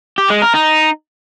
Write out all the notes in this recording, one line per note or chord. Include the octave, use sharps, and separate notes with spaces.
G4
G#3
A#4
D#4